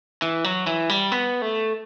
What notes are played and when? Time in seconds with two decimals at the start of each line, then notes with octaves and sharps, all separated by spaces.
0.22 E3
0.44 F#3
0.67 E3
0.90 G3
1.12 B3
1.42 A3